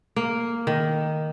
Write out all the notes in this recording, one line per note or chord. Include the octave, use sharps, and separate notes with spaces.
A#3
D#3